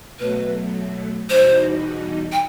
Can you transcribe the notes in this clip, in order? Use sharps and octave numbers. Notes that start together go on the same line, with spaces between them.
B2 F#3 A3 B4
E2 B2 G3 D#4 F#4 C5
G5